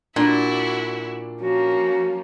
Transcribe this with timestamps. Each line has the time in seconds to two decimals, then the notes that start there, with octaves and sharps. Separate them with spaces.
0.16 A#2 D4 E4 F#4
1.41 F3 A#3 C#4 F#4